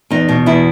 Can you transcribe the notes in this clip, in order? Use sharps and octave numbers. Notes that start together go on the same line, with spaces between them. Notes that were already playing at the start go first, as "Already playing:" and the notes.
E2 D#4
B2
E2 E4